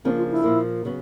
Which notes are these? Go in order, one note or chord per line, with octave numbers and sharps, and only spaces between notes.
C#3 F3 A#3 C4 D4
F4
E4
A#2 F3 A#3
C#3 F#3 B3